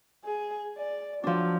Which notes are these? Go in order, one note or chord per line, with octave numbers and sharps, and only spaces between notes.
G#4
D5
F3 F#3 D4